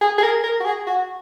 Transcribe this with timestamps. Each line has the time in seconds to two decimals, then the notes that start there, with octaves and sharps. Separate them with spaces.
0.01 G#4
0.18 G#4
0.23 A#4
0.44 A#4
0.60 F#4
0.65 G#4
0.87 F#4